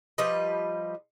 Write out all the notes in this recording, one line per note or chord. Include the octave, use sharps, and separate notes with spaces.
F3 G3 B4 D#5